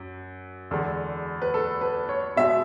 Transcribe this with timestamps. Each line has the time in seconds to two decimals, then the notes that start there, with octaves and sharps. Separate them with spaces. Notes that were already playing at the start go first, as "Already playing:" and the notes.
Already playing: F#2
0.71 E2 D3 G#3
1.42 B4
1.54 A4
1.81 B4
2.09 C#5
2.36 B2 G#3 E5